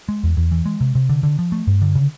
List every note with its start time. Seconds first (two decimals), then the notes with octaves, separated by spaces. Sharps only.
0.09 G#3
0.23 E2
0.37 E2
0.52 E3
0.66 G#3
0.81 C3
0.95 C3
1.09 D3
1.23 D3
1.39 F3
1.52 A3
1.67 G2
1.82 D3
1.95 C#3